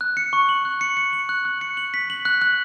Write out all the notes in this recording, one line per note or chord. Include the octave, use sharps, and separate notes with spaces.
F#6
C#7
C#6
F#7
F#6
C#7
C#7
F#7
F#6
F#6
C#7
F#7
B6
F#7
F#6
F#6